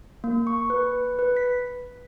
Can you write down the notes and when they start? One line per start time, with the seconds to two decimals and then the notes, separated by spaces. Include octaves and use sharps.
0.24 A#3
0.47 C#6
0.70 B4
1.19 B4
1.37 B6